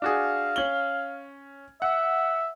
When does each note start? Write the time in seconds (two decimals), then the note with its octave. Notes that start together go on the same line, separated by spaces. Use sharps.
0.02 D4 F#4 G#4 F5
0.56 C#4 F#7 G7
1.82 E5 F#5